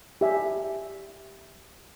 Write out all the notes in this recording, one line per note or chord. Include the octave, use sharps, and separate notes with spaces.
G4 E5 G#5